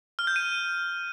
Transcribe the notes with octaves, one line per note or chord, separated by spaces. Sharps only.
F6
G6
D#7